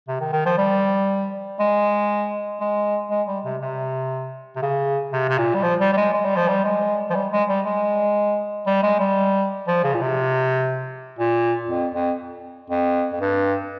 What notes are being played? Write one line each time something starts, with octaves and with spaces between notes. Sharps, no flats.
C3
D#3
D#3
F3
G3
G#3
G#3
G#3
G3
C3
C3
C3
C#3
C3
C3
A#2
G3
F3
G3
G3
G#3
G#3
G3
F3
G3
G#3
F3
G3
G#3
G3
G#3
G3
G#3
G3
F3
C#3
A#2
C3
A#2
F2
F2
F2
F2
G2